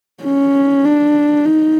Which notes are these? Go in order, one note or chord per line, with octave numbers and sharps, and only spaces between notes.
C#4
D4
D#4